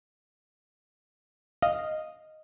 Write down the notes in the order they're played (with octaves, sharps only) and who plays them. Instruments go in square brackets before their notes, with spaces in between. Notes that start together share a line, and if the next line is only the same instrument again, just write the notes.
[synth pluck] D#5 F5